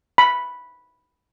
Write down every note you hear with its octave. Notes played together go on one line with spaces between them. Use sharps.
B5